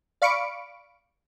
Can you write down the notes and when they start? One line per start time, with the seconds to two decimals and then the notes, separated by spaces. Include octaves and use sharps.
0.22 D5 F5 B5 C#6 C#7 D7